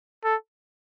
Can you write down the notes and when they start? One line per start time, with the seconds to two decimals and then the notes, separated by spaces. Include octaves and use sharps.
0.25 A4